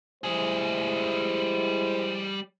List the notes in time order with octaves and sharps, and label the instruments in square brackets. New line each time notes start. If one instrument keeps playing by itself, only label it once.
[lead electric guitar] G3 G#4 [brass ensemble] G#3 E4 C5